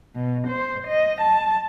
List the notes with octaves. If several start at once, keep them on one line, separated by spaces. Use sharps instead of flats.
B2
C5
D#5
A5